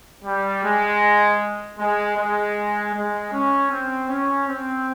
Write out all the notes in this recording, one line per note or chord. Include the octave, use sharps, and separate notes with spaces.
G3
G#3
G#3
G#3
G#3
C#4
C4
C#4
C4